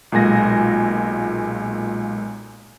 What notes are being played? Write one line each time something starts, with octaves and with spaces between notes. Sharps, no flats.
B1 A#2 G#3 G#5 A#6